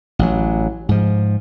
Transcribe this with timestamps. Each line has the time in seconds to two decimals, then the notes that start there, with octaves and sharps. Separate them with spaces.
0.19 A1 F#3
0.89 G#2 F3